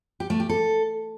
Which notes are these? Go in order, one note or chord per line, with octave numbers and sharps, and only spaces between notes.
G4
A3
G4
A4